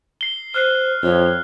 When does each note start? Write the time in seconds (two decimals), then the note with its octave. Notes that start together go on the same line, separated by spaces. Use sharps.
0.21 C7 G7
0.54 C5 F6 F#6 C7
1.03 F2 C#5